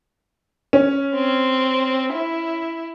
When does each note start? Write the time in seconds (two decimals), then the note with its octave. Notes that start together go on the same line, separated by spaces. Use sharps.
0.73 C#4
1.15 C4
2.13 E4